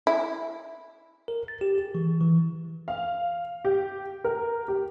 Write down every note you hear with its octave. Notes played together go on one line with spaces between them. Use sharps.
E4
A#4
A6
G4
G#4
E3
E3
F5
G4
A#4
G4